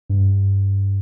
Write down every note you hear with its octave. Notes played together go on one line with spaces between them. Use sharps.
G2